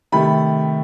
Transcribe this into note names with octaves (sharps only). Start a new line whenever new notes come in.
C3 D#3 A3 B5